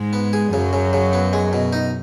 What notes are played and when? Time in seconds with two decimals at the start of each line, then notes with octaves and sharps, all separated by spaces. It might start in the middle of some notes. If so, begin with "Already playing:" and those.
Already playing: G#2 G#3
0.13 B3
0.33 G#4
0.53 F#2 C#3 F#3
0.73 C#3
0.93 C#3
1.13 B3
1.33 G#3
1.53 B2
1.73 D#4